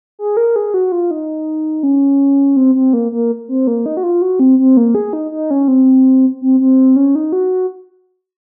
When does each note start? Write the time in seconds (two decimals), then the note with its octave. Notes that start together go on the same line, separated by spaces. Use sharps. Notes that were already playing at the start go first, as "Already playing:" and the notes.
0.19 G#4
0.37 A#4
0.56 G#4
0.74 F#4
0.92 F4
1.11 D#4
1.83 C#4
2.56 C4
2.75 C4
2.93 A#3
3.12 A#3
3.48 C4
3.67 A#3
3.86 D#4
3.97 F#4
4.03 F4
4.22 F#4
4.40 C4
4.59 C4
4.77 A#3
4.95 G#4
5.13 D#4
5.32 D#4
5.51 C#4
5.68 C4
6.41 C4
6.60 C4
6.96 C#4
7.15 D#4
7.32 F#4